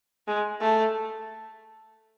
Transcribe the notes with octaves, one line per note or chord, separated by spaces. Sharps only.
G#3
A3